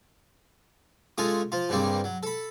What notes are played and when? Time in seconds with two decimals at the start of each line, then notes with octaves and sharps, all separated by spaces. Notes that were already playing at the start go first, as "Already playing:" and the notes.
1.18 G#3 A3 C#4 F4 G#4
1.52 F3 F4
1.69 G2 C#3 G3 A#3 C4
2.04 F#3
2.23 A4 B5